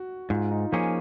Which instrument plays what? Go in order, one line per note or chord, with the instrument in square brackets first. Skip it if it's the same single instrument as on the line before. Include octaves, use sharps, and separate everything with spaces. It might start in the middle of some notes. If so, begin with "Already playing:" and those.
Already playing: [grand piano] F#4
[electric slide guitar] G#2 [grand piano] F4
[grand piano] D#4
[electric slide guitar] F3 A#3 C#4 G#4 [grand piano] F4